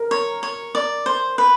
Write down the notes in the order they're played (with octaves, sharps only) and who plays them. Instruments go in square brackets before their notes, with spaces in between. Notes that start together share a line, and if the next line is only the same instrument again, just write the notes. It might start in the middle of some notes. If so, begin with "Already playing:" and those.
Already playing: [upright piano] A#4
[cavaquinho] C#5
C#5
D5
C5
B4